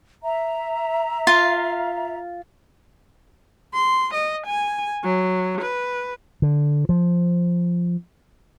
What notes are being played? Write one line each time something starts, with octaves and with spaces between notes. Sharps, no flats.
E5 A#5
F4 F5
C6
D#5
G#5
F#3
B4
D3
F3